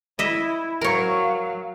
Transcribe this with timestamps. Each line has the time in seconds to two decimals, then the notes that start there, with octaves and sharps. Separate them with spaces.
0.19 E4 D#5 E5
0.81 F#3 A#4 C#5 F5